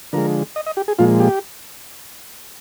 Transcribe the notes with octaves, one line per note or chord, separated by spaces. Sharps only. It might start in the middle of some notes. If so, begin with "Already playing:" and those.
D3 F3 G#3 A#4
D#5
D#5
G4
G#4
A#2 F3 G#3 F4
G4